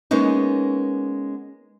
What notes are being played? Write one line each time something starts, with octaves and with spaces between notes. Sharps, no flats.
G#3 A#3 B3 C#4 D#4